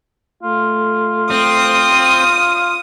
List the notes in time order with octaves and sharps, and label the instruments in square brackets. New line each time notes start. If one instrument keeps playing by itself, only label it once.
[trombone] A3 [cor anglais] F4
[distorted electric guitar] C4 [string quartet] D#6